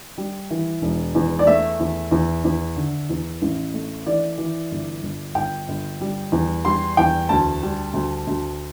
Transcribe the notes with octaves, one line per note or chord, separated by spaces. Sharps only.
G3
E3
E1
E2
D5
A3 E5
E2
E2
E2
D3
E2
A1
A3
E3 D5
E3
G1
G1
G1 G5
G1
G3
E2
G3 C6
E2 G5
D2 A5
G3
D2
D2